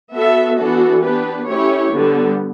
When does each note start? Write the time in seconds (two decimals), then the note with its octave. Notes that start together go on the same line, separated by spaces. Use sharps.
0.14 B3 F#4 A4 E5
0.59 E3 B3 D4 F#4 A4
1.03 B3 D4 G4 B4
1.48 A3 C#4 E4 G4 C#5
1.93 D3 G3 B3